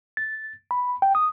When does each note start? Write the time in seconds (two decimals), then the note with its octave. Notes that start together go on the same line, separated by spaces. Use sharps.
0.17 A6
0.71 B5
1.02 G5
1.15 D#6